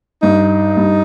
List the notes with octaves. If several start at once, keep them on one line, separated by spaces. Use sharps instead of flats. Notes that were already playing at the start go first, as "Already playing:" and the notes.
G2 D#4
G2